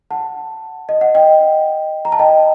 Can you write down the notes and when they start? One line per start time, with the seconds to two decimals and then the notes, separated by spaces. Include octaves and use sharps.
0.11 F#5 A5
0.89 D#5
1.01 F#5
1.15 D#5 G5
2.05 A#5
2.12 A5
2.19 D#5 G5